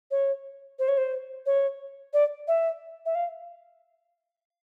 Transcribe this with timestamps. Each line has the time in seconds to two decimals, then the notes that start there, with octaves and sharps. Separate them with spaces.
0.11 C#5
0.79 C5
0.88 C#5
0.97 C5
1.46 C#5
2.13 D5
2.48 E5
3.06 E5
3.15 F5